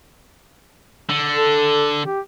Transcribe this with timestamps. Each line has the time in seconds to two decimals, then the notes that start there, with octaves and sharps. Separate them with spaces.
1.10 D3
1.36 A4
2.05 G4